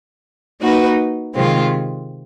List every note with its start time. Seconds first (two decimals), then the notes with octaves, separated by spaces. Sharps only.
0.60 A#3 D#4 F#4 B4
1.34 C3 D#3 G#3 C4 F4